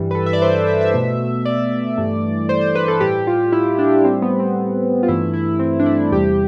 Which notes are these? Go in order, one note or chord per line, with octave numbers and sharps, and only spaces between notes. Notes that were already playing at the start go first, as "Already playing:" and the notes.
Already playing: G2 E3 G3
B4
A4
E5
D5
C5
D5
E5
E5
B2 A3
D5
G2 E3 A3
C5
C5
B4
A4
A2 G3 G4
F4
E4
D4
A2 G3 C4
B3
C4
F4
G2 E3 A3 E4
E4
C4
D4
E4
E2 C3 G3 G4